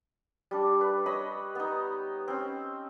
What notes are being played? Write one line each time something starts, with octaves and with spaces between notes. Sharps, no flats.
G3 D4
B4
C#5 D#5 B5
B3 D#4
C4 C#4